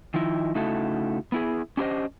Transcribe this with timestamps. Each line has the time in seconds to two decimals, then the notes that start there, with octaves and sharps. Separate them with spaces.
0.14 D#3 F3 D#4 E4
0.55 C#3 A3 D#4 E4 F#4 A4
1.32 B3 E4 G#4
1.77 C#4 D4 G4 A4 C5 D#5